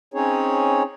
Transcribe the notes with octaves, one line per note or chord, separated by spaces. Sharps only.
C4 C#4 D#4 G#4 C#5